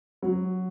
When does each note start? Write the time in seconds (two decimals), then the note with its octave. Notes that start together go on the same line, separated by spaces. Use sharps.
0.23 F#3